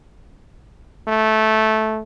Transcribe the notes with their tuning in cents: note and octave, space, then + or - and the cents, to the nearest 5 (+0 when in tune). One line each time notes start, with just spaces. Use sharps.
A3 -10